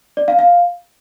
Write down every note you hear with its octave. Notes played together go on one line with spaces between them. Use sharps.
D5
F5
F5